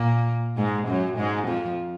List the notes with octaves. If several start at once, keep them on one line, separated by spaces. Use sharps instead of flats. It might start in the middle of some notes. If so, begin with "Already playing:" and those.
Already playing: A#2 A#3
G#2 G#3
F#2 F#3
G#2 G#3
F2 F3